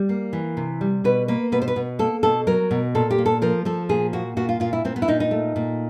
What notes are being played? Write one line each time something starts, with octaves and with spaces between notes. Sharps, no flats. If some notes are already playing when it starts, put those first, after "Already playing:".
Already playing: G3
A#3
E3
C3
G3
B2 B4
A#3 B4
B2 B4
C5
B4
B2
A#3 A4
B2 A4
F#3 A#4
B2
A#2 A4
G4
A#3
A4
F3 A#4
F3 A4
A#2 G#4
A#3 F#4
A#2 F#4
F4
A#2 F4
E4
A#2 C4
B3
E4
A#2 D#4
D#4
A3
A#2